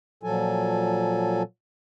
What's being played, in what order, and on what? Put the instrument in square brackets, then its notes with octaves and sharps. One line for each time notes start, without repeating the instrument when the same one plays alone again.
[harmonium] A#2 F3 F#3 A4 G#5